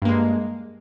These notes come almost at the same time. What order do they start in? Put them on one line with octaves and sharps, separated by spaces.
G2 A#3 G#3